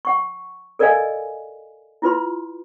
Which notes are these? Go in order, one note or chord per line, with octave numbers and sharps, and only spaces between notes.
F#5 C#6
A4 A#4 D5 D#5 F5 G#5
E4 F4 B4 C6